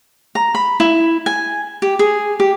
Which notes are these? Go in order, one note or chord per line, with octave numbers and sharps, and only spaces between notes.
A#5
B5
E4
G#5
G4
G#4
G4